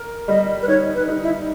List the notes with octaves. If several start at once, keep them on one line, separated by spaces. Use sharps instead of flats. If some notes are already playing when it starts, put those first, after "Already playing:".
Already playing: A#4
G3 D#5
B4
D#4 C#5
B4
D#4
E4